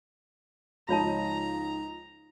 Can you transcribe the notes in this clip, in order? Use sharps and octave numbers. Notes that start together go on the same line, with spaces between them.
C#2 F3 D#4 F4 C#5 A5 A#5